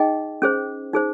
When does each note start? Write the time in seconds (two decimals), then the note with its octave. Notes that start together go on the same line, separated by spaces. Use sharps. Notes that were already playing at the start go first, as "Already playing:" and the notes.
Already playing: D#4 G#4 D#5 G5
0.42 C#4 G#4 C5
0.93 D#4 G#4 C5